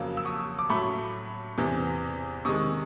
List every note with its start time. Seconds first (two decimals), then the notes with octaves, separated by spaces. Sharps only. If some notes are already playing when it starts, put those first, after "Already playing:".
Already playing: F2 C#3 F#3 A#3 E6
0.17 E6
0.25 C#6 D#6
0.59 D6
0.69 A2 F#3 A3 B5 C#6
1.58 E2 C3 E3
2.45 C3 D#3 G#3 C#6 D#6